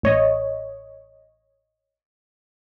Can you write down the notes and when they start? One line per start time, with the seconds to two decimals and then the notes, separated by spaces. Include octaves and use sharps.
0.03 A1 C#5 D#5